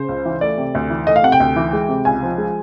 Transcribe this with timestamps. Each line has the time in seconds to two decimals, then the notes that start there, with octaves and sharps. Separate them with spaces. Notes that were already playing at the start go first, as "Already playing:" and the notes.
Already playing: C#3 C5
0.09 C#2
0.25 E3
0.41 A3 D5
0.58 C3
0.75 D2
0.90 E3
1.07 A3 D#5
1.16 F5
1.23 C3 F#5
1.32 G5
1.40 D2
1.56 E3
1.73 G#3
1.89 C3
2.05 C#2 G#5
2.23 F3
2.38 G#3